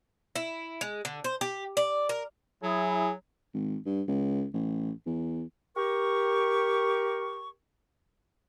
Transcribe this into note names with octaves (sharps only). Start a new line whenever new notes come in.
E4
G#3
D3
C5
G4
D5
A#4
F#3 E4 G#4
G#1
G2
C#2
A1
E2
G4 A#4 C#6